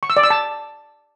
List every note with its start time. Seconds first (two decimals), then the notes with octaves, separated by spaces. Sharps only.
0.03 C#6
0.10 E6
0.17 D5
0.23 E6
0.30 A5